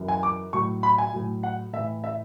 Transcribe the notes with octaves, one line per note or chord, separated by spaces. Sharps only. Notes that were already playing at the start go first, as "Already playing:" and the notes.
Already playing: F#2 E3
G#5
D6
A2 F#3 C#6
B5
G#5
A2 F#3
F#5
A2 E3 E5
E5